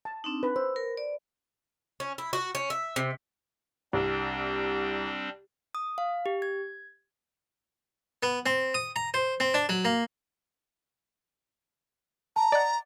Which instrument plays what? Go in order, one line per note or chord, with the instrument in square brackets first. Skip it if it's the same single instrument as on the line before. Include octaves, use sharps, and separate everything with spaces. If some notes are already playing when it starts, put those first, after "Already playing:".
[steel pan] A5
[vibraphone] C4 D4 D#4
[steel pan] B4
[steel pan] C5 [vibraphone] E6
[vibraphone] A#4
D5
[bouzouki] C#4
E4
F#4
C#4
E5
C3
[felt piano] C2 [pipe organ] G3 C4 D4
[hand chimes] D#6
F5
G4
G#6
[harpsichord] B3
C4
D#6
A#5
C5
C4
D4
F#3
A#3
[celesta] A5 [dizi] A#5
[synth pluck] D5 D#5 F#5 [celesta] A6